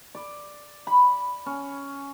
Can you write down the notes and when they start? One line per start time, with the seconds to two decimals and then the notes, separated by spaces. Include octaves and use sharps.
0.15 D5
0.87 B5
1.46 C#4